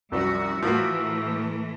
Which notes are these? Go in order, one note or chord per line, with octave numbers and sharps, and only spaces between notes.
C2 F#2 F3 G3 F#4 E5
A2 E3 F3 A3 E4 F#4 A#4